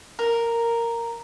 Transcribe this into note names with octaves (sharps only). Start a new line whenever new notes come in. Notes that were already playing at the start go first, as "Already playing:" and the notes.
A#4